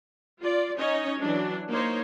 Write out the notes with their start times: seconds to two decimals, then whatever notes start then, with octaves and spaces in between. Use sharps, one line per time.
0.42 F4 D5
0.79 C#4 D#4 C#5 D#5
1.20 E3 F#3 D4
1.71 A#3 D#4 C5 C#5